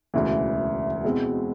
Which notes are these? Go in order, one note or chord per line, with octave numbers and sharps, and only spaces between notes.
E1 D2 C#3 E3
B2 G#3 C4 E4